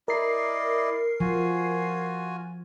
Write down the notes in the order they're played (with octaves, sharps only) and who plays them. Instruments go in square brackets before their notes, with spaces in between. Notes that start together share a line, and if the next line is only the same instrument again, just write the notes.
[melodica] E4 D5 D#5 [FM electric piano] A#4 C7
[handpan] F3 [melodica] F4 F#4 G#5